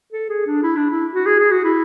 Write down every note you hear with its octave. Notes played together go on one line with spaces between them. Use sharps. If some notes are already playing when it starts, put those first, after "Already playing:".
A4
G#4
D4
E4
D4
E4
F#4
G#4
G#4
F#4
E4